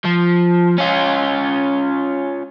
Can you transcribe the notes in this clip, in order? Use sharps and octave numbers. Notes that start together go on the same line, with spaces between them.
F3
C#4 F4